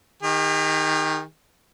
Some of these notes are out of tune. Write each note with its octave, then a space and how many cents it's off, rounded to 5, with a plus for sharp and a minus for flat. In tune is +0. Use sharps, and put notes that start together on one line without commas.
D#3 +0 G4 +45